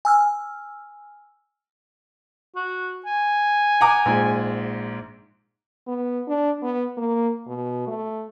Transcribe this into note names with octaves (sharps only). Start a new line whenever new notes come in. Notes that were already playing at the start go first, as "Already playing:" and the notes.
G#5 E6 F6
F#4
G#5
F#5 A#5 D6
A#1 G#2
B3
D4
B3
A#3
B2
A3